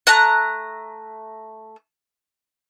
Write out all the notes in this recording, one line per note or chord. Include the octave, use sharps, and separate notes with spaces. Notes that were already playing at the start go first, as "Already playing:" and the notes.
A3 A#5 F#6